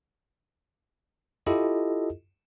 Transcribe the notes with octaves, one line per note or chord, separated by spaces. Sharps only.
E4 F4 G4 A4 D#5